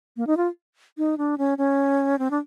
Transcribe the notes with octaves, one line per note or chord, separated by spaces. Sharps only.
A#3
D#4
F4
D#4
D4
C#4
C#4
C4
D4